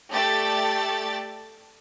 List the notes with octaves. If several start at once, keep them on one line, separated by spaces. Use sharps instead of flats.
A3 G4 A4 D5 A6